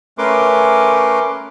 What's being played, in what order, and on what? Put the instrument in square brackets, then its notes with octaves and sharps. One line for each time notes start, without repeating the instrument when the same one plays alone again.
[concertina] A3 C#4 A#4 B4 C6 D6